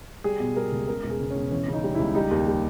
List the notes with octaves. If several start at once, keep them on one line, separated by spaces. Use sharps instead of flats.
G3 G#4
B2
G3 A#4
C#2
C#3 A#4
E1
G#4
C#3
C#4
E1
E3 C#4
C#3 D#4
G3
C#2 E4
G3 D#4
D#2
G3